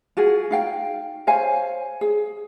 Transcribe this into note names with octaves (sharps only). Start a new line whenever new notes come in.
F4 F#4 G#4
D#4 F5 G5
C5 C#5 F5 G#5
G#4